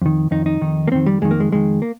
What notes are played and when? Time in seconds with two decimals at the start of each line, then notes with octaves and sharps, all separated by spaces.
0.02 F2 D#3
0.31 F2 D#3 D#4
0.46 D#4
0.61 F2 D#3
0.88 A#3
0.92 F2 D#3 C4
1.06 G3
1.21 F2 D#3 G#3
1.31 A#3
1.40 G#3
1.52 F2 D#3 G#3
1.82 A#3